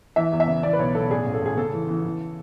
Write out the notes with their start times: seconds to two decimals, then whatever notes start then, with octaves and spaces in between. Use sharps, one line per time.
0.16 E3 E5
0.32 E2
0.40 E5
0.48 C#3
0.63 E3 D5
0.73 B4
0.79 B1 C#5
0.95 B1 A4
1.11 A1 G#4
1.26 A1
1.34 A4
1.42 A1 G#4
1.57 C#3 A4
1.73 E3
1.89 E3
2.04 E3